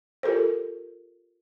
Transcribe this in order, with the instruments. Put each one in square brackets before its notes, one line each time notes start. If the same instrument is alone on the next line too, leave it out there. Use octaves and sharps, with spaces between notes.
[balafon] F4 G4 A4 A#4 C5